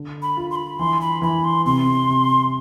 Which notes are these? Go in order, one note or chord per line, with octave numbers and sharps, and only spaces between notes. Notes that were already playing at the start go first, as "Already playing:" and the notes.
Already playing: D3
B5
F4
C6
B5
E3 C6
B5
E3 B5
C6
C3 C6
C3